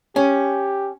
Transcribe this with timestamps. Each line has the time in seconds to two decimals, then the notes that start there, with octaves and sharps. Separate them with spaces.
0.16 C#4 G4